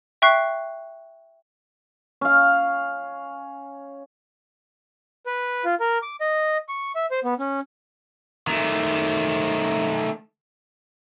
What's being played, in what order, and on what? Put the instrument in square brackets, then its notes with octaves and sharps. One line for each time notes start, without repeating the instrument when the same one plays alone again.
[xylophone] E5 G5 C#6 F#6 C7
[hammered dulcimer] C#4 F5
[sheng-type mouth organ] B4
F4
A#4
D6
D#5
C#6
E5
C5
B3
C#4
[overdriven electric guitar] D#3 A3